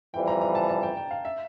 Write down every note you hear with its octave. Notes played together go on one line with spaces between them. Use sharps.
F2 E3 G3 G5
A#5
A#5
A5
A5
G5
G5
F5
E5